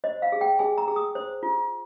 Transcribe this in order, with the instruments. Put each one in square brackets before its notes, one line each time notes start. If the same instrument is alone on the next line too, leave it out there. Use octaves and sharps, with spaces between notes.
[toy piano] C5 D#5
F5
G#4
G5
G#4 G#5
A#5
G#4
D#6
C5
F4